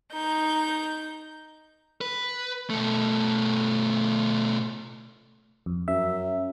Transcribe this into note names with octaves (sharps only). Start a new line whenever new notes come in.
D#4 G6
B4
B2 A3
F2
F#2 E5